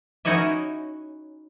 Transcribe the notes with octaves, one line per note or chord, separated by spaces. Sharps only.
C#4 D#4 E4 F#4 D#5 E5